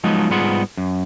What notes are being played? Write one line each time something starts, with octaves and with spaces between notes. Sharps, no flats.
F3 F#3 G#3 B3 D#4
G#2 G3 B3 F4 G#4 F#5
F#2